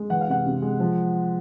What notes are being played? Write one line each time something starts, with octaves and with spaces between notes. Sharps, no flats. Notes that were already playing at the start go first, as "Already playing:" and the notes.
Already playing: G#3
E3 F#5
F5
C3 F#5
C3
G#3
F3